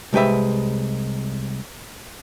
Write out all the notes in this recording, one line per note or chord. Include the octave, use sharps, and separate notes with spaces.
C2 G#3 G4 B4 E5